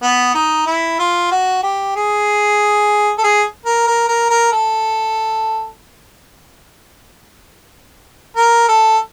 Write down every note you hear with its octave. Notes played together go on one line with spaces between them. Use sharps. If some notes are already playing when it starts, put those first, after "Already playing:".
B3
D#4
E4
F4
F#4
G4
G#4
A4
G#4
A#4
A#4
A#4
A#4
A4
A#4
A4